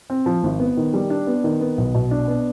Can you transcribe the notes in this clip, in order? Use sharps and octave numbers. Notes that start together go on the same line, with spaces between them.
C4
F3
G#1
B3
D#3
G3
D4
B3
D#3
B3
B1
B2
D4
B3